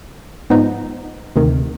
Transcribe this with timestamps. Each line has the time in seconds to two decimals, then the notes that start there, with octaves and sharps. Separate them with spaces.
0.50 G#2 F3 B3 D#4
1.36 D2 C3 D#3